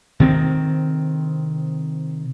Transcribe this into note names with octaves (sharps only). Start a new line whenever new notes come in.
C3 D#3 C4